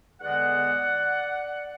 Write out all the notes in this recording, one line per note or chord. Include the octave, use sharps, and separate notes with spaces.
E2 D3 G#3 B3 D5 F#5